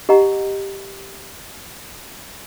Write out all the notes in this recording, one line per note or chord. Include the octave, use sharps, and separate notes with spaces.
G4 D#5 F#5 A#5